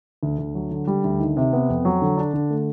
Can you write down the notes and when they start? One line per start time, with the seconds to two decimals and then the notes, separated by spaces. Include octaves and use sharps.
0.23 D2
0.39 D2
0.55 F#3
0.71 D3
0.87 G3
1.04 D2
1.20 D#3
1.37 C3
1.53 B3
1.69 F2
1.85 F#3
2.02 D3
2.17 D4
2.33 D3
2.50 A3